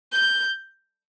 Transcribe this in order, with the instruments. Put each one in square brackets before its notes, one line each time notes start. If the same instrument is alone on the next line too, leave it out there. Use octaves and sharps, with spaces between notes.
[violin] G6